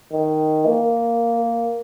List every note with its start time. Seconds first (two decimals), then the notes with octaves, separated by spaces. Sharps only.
0.12 D#3
0.66 A#3